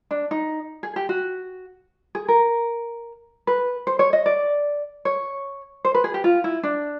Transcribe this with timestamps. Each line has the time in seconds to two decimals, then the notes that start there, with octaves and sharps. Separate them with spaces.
0.11 D4
0.31 D#4
0.83 G#4
0.96 G4
1.09 F#4
2.15 G#4
2.28 A#4
3.47 B4
3.87 C5
3.99 C#5
4.13 D#5
4.26 D5
5.05 C#5
5.85 C5
5.95 B4
6.04 G#4
6.14 G4
6.24 F4
6.44 E4
6.63 D4